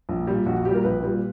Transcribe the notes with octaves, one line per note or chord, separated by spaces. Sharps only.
A#1
A#2 G3
A#1 F#4
F#4
A#2 G3 G4
A#4
A#1 B4
A#2 G3